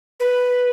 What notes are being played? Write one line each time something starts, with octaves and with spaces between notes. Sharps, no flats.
B4